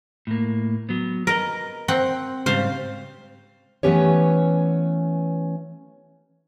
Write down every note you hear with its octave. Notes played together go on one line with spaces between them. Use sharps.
A2 A#3
F#3 B3
A#4 B4 D#5
C4 F#5
G#2 C#3 G3 C5 F5
E3 A3 B3 C#4 G4 C#5